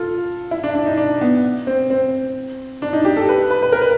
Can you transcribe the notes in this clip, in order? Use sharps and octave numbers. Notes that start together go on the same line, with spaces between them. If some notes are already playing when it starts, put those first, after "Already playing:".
Already playing: F4 A4
E4
D4
D4
D#4
D4
B3
C4
C4
D4
D#4
G4
A4
B4
B4
B4
A#4
B4